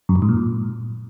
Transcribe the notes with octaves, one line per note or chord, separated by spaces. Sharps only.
F#2
G2
G#2
A#2